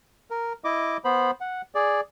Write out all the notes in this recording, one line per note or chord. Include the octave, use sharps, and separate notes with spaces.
A#4
E4 D#5 D6
B3 C5 B5
F#5
G#4 D5